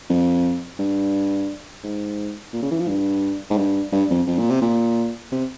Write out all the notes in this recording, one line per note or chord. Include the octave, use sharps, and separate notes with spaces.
F2
G2
G#2
A#2
C#3
E3
F3
G2
G#2
G2
G2
F2
F2
A#2
C3
A#2
C3